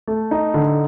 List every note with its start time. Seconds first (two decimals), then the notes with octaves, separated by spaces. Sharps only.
0.08 A3
0.31 D#4
0.54 D3